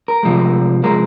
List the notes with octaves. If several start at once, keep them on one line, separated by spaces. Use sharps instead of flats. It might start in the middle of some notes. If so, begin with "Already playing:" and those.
A#4
C3 F3 G#3
C3 F3 G#3 A#4